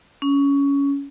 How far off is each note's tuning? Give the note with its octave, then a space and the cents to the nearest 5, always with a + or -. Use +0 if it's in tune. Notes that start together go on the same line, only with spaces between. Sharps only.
C#4 +15